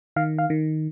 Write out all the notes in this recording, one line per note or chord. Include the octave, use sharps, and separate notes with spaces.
D#3 F5
F5
D#3